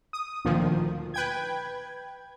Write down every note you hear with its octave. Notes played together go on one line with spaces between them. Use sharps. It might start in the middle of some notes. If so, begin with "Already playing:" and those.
D#6
D2 A#2 D#3 F3
B4 G5 G#6